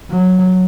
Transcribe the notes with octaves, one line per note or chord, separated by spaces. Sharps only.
F#3